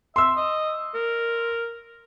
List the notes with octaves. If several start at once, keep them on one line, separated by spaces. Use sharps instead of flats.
E5 C6 E6
D#5
A#4